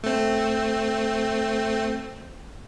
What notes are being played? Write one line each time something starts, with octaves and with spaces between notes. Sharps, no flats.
A3 C4